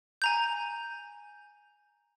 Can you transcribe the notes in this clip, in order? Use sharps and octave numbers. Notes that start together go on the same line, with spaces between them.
G#5 A#5 G6